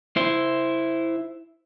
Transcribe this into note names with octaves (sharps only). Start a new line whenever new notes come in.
E4 C5